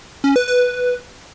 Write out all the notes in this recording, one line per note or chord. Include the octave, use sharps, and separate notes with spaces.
C#4
B4
B4